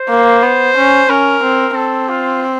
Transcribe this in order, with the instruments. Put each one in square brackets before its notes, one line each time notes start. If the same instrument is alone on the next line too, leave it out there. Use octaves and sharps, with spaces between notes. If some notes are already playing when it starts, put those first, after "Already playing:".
Already playing: [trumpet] C5
[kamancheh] A#3
B3
C#4
[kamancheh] C#4 [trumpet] A#4
[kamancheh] C4
[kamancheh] C4 [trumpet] A4
[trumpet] F4